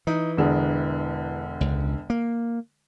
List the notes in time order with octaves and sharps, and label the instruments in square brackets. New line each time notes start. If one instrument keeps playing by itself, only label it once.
[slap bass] E3 [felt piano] D#4
[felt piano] E1 D3 G#4
[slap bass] C#2
A#3